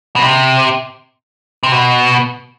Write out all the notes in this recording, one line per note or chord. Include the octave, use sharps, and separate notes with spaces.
B2
C3
C3
B2